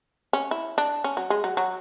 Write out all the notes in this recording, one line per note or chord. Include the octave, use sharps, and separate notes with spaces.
C#4
E4
D4
C#4
F#3
G#3
F#3
F#3